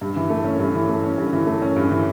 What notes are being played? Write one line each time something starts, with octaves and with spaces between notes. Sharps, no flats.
G2
E3
A3
C#4
G2
E3
A3
C#4
G2
E3
A3
C#4
G2
E3